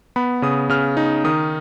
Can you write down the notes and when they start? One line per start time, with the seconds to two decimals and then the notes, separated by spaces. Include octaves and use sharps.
0.16 B3 B5
0.42 C#3 D#6
0.69 C#3 F6
0.97 D#4
1.24 D#3 D#6